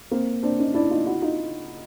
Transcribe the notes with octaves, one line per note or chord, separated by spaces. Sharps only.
A#3 C4
C4 D4
C#4 D#4
D4 E4
D#4 F4
E4 F#4
D#4 F4